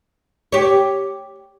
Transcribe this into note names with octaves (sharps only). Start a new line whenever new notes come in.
G4 C#5